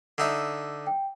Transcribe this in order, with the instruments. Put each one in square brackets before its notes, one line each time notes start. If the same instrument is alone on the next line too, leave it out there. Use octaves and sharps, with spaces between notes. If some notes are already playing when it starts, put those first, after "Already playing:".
[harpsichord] D3 D#4 E5
[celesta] G5